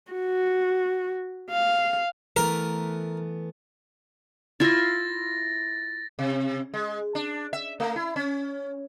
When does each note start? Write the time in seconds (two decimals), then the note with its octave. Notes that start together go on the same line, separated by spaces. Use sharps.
0.13 F#4
1.50 F5
2.36 E3 A3 B3 A#4
4.60 E4 F4 E5 A6 A#6
6.19 C3
6.74 G#3
7.15 D4
7.53 E5
7.80 A3
7.96 E4
8.16 C#4